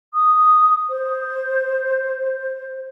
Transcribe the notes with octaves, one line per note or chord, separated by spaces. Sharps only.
D#6
C5